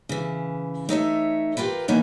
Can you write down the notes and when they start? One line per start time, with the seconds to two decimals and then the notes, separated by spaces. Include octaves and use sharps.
0.09 C#3 E3
0.89 A3 D#4 C#5 E5
1.57 F4 G4 A#4 B4
1.88 E3 A#3 B3 C#4 D#4